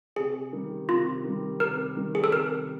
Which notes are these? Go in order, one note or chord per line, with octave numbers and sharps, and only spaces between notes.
C3 G#4
D#3 G3
C3 F4
D#3 G3
C3 A#4
D#3 G3
G#4
A4
C3 A#4